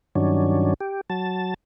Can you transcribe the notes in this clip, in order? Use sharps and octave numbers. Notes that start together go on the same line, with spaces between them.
G2 D#3 F#3 C#4 D4
G4
F#3 A5